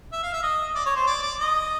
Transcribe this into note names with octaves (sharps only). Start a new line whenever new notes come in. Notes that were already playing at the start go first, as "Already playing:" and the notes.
E5
F5
E5
D#5
D5
C#5
C5
D5
D5
D#5